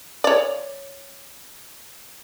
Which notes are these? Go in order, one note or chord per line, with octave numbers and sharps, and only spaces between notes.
C#5 D5